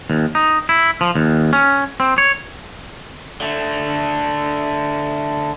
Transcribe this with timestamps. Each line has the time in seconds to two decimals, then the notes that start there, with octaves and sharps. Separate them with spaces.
0.10 D#2
0.35 D#4
0.69 E4
1.01 F3
1.15 D#2
1.53 C#4
2.00 C4
2.18 C#5
3.40 D3 A3